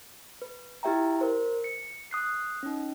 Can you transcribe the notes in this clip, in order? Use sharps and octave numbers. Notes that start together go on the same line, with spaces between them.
B4
E4 F4 G4 E5 G5 A#5
A#4 C5
C#7
D#6 F#6 C7
C#4 D#4